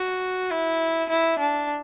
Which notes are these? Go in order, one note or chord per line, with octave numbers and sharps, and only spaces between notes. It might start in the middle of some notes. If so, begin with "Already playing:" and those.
Already playing: F#4
E4
E4
D4